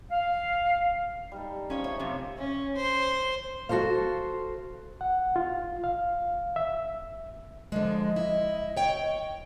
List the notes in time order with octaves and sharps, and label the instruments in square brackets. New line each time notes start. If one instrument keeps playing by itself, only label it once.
[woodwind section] F5
[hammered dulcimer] G3 D#4 A4
[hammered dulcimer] F3 [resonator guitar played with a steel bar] C#4 C#5
[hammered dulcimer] A3 F4 [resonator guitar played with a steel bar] C#5
[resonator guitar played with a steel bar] F#2 C3
[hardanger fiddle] C#4
C5
[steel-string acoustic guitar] F#4 G4 A4 C5 F5
[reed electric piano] F#5
F4
F5
E5
[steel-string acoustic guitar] D3 F3 G#3 [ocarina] D#5
[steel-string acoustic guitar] E4
C#5 G5